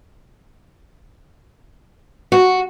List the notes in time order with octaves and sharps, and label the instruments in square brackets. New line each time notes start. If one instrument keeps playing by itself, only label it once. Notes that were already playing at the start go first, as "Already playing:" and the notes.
[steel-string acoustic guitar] F#4